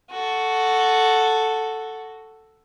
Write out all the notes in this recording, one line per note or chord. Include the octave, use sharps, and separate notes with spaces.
F#4 A4